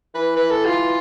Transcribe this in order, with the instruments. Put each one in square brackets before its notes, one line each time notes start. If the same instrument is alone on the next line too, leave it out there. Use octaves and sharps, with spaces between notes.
[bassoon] E3 [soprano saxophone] B4
[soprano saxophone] B4
A4
F4